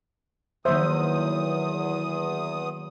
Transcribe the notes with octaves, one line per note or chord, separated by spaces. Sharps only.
E2 D#3 F#3 A#3 C5 E5 D#6